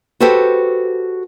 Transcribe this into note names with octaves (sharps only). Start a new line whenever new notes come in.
F#4 G4 A4 B4 C5 G5